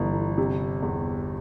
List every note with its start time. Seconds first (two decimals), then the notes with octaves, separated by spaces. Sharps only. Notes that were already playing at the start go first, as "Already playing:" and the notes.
Already playing: G1 E3
0.38 C3
0.82 E2